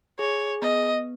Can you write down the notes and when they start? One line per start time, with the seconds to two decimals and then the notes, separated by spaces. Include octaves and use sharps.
0.19 G#4 C#5
0.62 B3 D#5